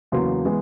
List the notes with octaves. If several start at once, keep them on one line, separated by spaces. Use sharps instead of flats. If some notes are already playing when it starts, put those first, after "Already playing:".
E2 C#3 F#3 A#3 C6
E3 G#3 B3